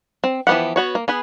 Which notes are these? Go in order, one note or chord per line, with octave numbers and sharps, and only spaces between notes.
C4
E3 F3 B3 G4 F#5
B3 F#4 C#5
A#3
B3 G#4 B4